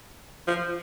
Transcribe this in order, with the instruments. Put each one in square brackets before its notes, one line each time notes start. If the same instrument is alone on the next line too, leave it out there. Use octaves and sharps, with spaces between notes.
[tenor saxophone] F3